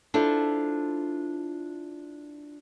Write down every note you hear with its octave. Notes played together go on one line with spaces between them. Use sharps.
D4 E4 F4 A4 C5